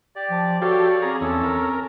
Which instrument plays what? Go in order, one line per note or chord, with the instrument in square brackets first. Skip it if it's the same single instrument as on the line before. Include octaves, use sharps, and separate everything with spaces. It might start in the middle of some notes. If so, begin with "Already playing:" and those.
[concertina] G4 D5
[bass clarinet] F3
[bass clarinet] F#4 [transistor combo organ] G4 A4 [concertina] C#5 D5 F5
[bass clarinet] C4 [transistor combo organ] G#4 A#5
[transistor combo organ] E2 [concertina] C#4 A4
[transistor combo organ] A#4